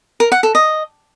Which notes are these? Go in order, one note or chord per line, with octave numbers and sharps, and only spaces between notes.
A#4
F#5
A4
D#5